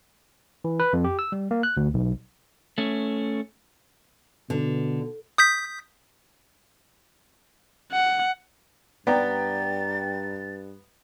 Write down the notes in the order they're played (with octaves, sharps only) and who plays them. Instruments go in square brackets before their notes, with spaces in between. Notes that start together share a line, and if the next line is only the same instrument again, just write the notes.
[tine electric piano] E3
B4
F2
G4
E6
G3
A#3
F#6
D2
B1
[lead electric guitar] A3 C#4
[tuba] B2 [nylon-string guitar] D3
[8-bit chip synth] D#6 G6 B6
[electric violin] F#5
[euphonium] G2 [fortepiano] B3 [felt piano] D5 G5 A#5 [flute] A6